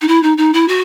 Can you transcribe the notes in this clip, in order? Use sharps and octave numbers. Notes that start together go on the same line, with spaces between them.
D#4
E4
D#4
D#4
E4
F#4